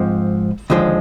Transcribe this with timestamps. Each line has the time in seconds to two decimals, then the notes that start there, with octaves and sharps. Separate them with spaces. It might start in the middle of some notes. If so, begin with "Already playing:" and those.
Already playing: G#2 F3 C4
0.70 D#2 D3 F3 G#3